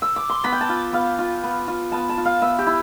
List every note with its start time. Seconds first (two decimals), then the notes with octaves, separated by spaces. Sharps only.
0.02 E6
0.16 D6
0.29 C6
0.44 B3 B5
0.52 G5
0.61 A5
0.69 F4
0.93 B3 F5
1.19 F4
1.43 B3
1.68 F4
1.92 B3 A5
2.09 A5
2.17 F4
2.25 F5
2.41 B3 E5
2.59 G4
2.66 E4